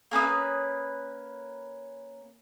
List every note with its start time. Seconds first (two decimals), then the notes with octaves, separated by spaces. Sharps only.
0.11 A#3 C#4 B4 D#6